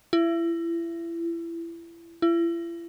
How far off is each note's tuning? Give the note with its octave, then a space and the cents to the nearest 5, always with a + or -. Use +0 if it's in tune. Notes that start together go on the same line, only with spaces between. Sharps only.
E4 +30
E4 +40